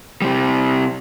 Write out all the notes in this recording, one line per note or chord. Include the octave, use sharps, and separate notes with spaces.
C3 G3